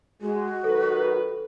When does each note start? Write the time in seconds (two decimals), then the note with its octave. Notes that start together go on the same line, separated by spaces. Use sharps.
0.22 G#3 F#4
0.64 D#3 F#3 A4 B4